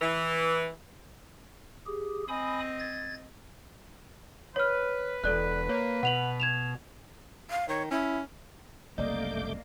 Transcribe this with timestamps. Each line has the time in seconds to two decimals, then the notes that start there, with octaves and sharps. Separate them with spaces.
0.01 E3
1.86 G4 G#4
2.28 C4 D#5 G#5 B5 D#6
2.79 G#6 A6
4.56 B4 C#5 F6
5.24 E1 A4 D5 F#6
5.69 A#3 C#5
6.03 B2 F#5 F7 F#7
6.40 G#6 E7 F7
7.50 F5
7.68 D#3 C#5
7.91 C#4 E4
8.98 F#1 C2 A3 A#3 D5 D#5 D6 G6